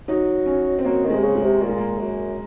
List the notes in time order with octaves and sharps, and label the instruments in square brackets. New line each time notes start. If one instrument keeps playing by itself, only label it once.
[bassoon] F#3 [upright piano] D#4
[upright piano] C#4
C4
[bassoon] F#3 [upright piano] A#3
[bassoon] D#3
[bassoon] C3 [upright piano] G#3
[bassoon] C#3
[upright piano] G#3
[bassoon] C3
[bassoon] A#2 [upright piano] A#3
[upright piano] G#3
A#3
[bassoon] F#2